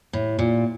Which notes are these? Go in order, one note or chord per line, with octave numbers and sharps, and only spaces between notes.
A2
A#2